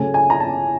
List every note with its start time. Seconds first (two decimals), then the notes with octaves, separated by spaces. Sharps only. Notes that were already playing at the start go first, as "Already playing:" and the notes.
Already playing: C#3 F#3 A3 C#4 G#5
0.14 G#5
0.30 A#5
0.40 A5